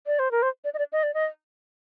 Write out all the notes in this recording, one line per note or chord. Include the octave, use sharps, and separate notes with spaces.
D5
C5
A#4
C5
D5
D#5
D5
D#5
D5
D#5